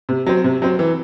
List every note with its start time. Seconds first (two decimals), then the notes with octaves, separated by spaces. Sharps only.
0.09 C3
0.27 F#3 C4
0.44 C3
0.62 F#3 C4
0.79 E3